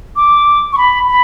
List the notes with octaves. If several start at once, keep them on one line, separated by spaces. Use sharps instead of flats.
D6
C#6
B5
B5